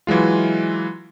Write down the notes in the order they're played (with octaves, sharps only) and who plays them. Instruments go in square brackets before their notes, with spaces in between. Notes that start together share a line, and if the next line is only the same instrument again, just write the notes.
[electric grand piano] E3 F#3 G#3 F4